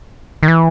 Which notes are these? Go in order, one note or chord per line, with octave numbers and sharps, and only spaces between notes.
D#3
E3